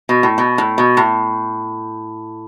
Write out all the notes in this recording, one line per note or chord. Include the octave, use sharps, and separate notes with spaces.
B2
A2
B2
A2
B2
A2